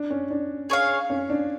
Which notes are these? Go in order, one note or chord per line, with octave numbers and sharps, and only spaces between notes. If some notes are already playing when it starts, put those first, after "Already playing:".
Already playing: D4
C#4
D4
G#4 C#5 F5
C#4
D4